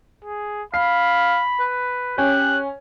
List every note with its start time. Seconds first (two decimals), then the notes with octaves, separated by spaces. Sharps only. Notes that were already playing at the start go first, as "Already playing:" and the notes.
0.24 G#4
0.74 F5 B5 C7
1.60 B4
2.18 C#4 G4 F#6